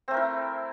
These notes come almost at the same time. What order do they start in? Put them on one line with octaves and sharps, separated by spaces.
C4 A3 A#4 E4